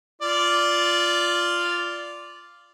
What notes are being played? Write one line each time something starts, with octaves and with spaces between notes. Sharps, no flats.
F4 D5